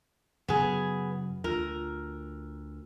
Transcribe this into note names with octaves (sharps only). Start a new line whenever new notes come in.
F#2 C#3 F#3 B3 G#4
D2 F4 A#4